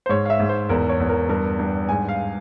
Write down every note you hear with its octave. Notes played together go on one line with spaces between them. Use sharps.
C5
G#2 C#5
F5
E5
G#2
C5
E2 A#4
C#5
E2
A#4
G2 A#4
G2
G#2 G#5
F5